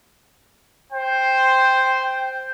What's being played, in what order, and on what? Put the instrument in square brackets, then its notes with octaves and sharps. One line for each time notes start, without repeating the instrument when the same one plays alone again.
[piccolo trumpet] C5 [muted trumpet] G5